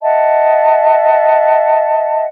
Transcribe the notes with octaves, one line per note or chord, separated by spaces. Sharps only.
D#5 E5 F#5 A5